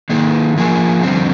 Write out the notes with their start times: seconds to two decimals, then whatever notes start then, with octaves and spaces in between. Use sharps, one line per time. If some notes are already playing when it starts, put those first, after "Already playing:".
0.09 D#3 A#3 D#4 G#4
0.56 F3 A#3 F4 G#4
1.03 F2 D3 G3 C4